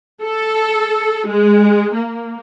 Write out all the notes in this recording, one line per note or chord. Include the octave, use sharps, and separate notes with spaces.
A4
G#3
A#3